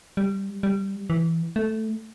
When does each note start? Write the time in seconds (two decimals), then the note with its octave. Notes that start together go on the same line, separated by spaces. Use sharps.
0.17 G3
0.63 G3
1.10 E3
1.56 A3